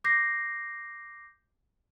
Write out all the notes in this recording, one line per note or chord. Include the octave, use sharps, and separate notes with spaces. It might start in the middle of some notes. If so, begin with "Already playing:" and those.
D6 G6 A#6 C7